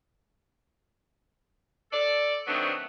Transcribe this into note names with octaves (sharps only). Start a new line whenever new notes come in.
A4 D5
D#3 F#3 A3 B3 C4 D4